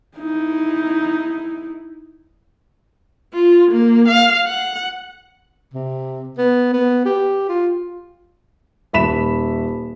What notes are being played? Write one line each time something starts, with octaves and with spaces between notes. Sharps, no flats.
D#4 E4
F4
A#3
F5
F#5
C3
B3
B3
G4
F4
D#1 E5 B5 B6 E7